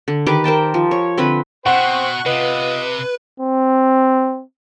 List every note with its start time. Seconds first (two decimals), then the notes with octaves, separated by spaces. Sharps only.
0.08 D3
0.26 D#3 G4 B4 D6
0.44 A#4 C5 G5 A5
0.74 F3
0.91 C#5
1.18 D3 C4 B4 B5
1.66 B2 C5 F#5 G5 C#6 F#6
2.26 C3 F4 B4 D#5
3.40 C4